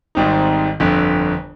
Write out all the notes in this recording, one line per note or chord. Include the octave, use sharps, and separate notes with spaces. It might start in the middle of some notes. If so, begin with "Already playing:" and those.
G#1 G#2 G3 C4 D#4
G1 F2 D3